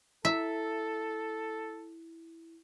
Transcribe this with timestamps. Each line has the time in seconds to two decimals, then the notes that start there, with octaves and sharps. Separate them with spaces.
0.25 E4 A4 E5